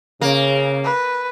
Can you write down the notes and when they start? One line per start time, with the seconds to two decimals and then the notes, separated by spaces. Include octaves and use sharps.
0.21 C#3 A#3
0.84 B4